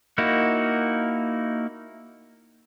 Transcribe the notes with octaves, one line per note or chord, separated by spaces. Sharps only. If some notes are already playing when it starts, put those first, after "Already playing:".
A#3 D#4 E4 F#4